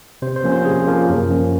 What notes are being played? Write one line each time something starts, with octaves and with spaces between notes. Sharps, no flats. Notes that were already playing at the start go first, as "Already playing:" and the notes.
C3 C5
C5
F3 A#3 C#4
C5
C3 G#4
F3 A#3 C#4
F#2 A#4
F3 A#3 C#4